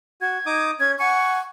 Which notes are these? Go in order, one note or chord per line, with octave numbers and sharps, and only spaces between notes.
F#4 G#6
D#4 D6 D#6
C#4 G#6
F#5 G#5 C#6 C#7